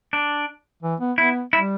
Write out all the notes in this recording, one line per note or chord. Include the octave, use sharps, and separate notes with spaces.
D4
E3
B3
B3 E4
G3 E4